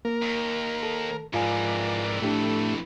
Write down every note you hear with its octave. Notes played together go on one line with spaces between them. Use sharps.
A#3 A#4
D#2
A4
F2 G#2 E3 F4 A#4 D5 F5 G#5
A2 A3 D4 G4 A4